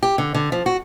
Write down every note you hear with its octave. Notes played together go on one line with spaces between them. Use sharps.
G4
D3
D3
F3
F#4